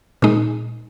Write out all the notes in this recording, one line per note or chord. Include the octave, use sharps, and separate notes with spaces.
A#2 G#3 D#4